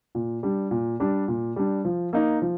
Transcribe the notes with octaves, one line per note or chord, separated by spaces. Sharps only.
A#2
G3 D4
A#2
G3 D4
A#2
G3 D4
F3
A#3 D#4
F3